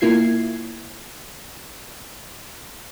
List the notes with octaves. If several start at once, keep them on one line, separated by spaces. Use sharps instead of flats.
B2 A#3 E4 F4 G#6 C7